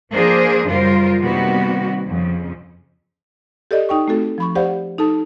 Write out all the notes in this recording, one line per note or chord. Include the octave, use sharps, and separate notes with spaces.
F3 A#3 D4 G#4 A#4 C5
F#2 C#3 G3 F4 A#4 C5
C3 D#3 G3 A#3 B3 F#4
F2 C#3
G4 A4 D5 D#5
D#4 G5 C#6
A3 C4 F#4 A4
F3 B5 C#6
G4 C5 D5 F5 F#5
D#4 A4 A5